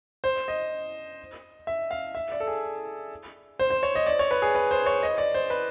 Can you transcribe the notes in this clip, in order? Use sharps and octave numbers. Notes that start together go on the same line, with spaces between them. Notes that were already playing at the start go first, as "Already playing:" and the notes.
C5
D#5
E5
F5
E5
D5
A4
G#4
C5
C5
C#5
D#5
D5
C#5
B4
G#4
B4
C5
C#5
D#5
D5
C5
B4